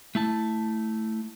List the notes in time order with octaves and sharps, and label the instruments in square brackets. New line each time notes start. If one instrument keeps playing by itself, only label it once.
[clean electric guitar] A3 E4 A5